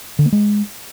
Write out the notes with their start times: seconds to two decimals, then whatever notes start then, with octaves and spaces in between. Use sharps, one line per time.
0.19 D3
0.26 A#3
0.32 G#3